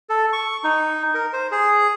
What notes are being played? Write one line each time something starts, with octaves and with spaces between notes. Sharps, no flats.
A4
C#6
D#4
A#4
C5
G#4